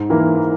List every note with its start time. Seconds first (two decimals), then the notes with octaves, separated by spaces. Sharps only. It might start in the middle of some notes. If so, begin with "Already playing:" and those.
Already playing: G#2
0.10 E3 A#3 E4 A#4